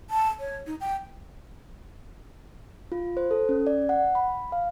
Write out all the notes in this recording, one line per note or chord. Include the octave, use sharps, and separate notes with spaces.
A5
C#5
D#4
G5
F4
C5
A4
C#4
D5
F#5
B5
F5